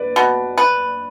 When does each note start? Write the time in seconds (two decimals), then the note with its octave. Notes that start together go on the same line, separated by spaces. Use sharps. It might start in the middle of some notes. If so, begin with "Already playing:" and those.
Already playing: B4 D5
0.16 B2
0.58 B4